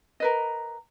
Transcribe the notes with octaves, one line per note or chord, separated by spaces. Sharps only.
A#4 B4 D#5